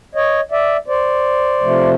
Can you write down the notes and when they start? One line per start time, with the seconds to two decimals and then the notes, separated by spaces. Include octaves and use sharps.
0.15 C#5 D#5
0.52 D5 E5
0.88 C5 D5
1.61 C3 F3 A3